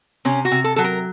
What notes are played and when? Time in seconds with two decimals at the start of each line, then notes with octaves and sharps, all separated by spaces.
0.25 C3 C#4
0.45 F#4
0.52 C3
0.64 A4
0.76 F#3 A4
0.84 A#4